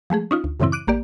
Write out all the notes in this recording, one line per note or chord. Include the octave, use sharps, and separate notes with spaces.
F3 G#3 A3 G#4
C#4 D#4 F4
D2
F#2 A2 C#3 E3 C4 E4
D6 F#6 D7 D#7
A1 A#3 G4 D5